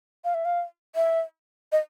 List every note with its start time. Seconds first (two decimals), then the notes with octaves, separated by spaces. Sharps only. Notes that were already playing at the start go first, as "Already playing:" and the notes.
0.24 F5
0.34 E5
0.45 F5
0.96 E5
1.72 D#5